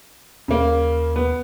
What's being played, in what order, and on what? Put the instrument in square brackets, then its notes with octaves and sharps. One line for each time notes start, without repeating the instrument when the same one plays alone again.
[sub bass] D#2 [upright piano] C#3 A#3
[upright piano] B3